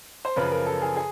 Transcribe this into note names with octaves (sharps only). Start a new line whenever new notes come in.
C5
F#2 C#3 F3 B4
A#4
A4
G#4
G#4